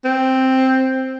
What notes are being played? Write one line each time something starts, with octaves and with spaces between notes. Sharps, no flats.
C4